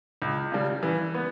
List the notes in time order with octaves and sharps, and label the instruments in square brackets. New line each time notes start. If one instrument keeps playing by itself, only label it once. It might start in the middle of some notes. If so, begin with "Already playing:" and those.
[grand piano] C#2
C#3 G3
E3
B3